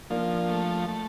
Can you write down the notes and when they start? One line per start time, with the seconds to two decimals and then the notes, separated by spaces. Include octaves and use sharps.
0.10 F3 A#3 D4
0.49 A3
0.88 A3